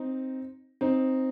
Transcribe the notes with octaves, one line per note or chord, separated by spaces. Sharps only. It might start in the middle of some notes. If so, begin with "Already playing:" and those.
Already playing: C4 D#4
C4 D#4